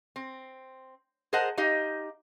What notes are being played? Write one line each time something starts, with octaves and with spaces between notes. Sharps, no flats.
C4
G#4 A#4 C5 D#5 F#5 A5
D#4 G4 D#5 F5